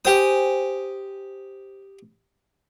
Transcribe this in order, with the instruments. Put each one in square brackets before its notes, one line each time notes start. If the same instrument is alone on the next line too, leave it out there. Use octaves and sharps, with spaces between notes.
[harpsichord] G4 D#6 [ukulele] C5 G5 G#5